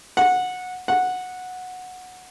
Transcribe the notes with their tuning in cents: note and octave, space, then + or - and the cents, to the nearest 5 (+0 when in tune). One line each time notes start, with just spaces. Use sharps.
F#5 -15
F#5 -10